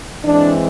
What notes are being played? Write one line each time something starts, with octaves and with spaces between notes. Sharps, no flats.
E3 G#3 C4 D4